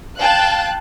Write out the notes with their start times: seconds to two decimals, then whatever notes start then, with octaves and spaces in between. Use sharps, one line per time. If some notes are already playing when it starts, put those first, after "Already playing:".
0.20 F5 G5 A5 F#6